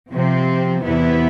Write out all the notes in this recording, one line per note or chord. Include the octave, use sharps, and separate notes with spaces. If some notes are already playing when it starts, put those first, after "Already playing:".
C3 F3 C4
E2 C3 E3 B3 E4